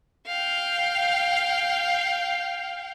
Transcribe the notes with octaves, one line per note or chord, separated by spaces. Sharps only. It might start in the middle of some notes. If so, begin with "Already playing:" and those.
F5 G5